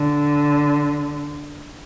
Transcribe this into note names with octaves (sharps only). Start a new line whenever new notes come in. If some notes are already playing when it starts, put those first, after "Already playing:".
Already playing: D3